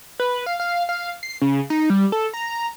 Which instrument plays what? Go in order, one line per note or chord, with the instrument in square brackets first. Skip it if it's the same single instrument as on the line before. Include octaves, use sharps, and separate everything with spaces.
[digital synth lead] B4
F5
F5
F5
C7
C#3
D#4
G3
A4
A#5